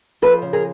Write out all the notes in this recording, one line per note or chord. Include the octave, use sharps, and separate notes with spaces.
F3 A4 B4
C#3
G#4 A#4